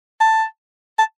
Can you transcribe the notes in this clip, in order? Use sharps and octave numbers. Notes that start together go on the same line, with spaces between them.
A5
A5